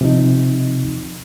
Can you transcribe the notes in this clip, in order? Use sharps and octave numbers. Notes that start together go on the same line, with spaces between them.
C3 F3 D#4